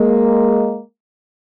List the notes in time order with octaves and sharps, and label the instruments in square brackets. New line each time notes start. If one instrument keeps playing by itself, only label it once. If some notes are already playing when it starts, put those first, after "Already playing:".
Already playing: [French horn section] G#3 A#3